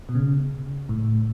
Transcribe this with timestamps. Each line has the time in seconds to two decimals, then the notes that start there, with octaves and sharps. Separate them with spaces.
0.09 B2
0.15 C#3
0.89 A2